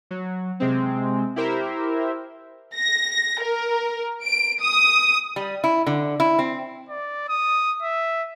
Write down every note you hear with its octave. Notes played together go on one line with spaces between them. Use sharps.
F#3
C3 G#3 C4
E4 G4 A#4 C5 E5
A#6
A#4
D7
D#6
G3
E4
D3
E4
C4
D5
D#6
E5